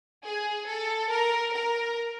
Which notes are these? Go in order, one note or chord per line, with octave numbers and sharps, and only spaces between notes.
G#4
A4
A#4
A#4